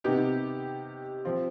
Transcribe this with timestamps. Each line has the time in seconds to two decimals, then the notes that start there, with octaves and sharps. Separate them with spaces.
0.04 C3 D#3 B3 D#4 G4
1.25 F3 C4 F4